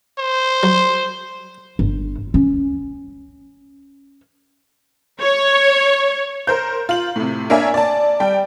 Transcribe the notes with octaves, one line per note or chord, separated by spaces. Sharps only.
C5
F#3
G1
C#4
C#5
A#4 C5 G6
F4 F#7
A2 C3
A#3 D4 A#4 C#5 E5 G#5
D5 A5
G3 G5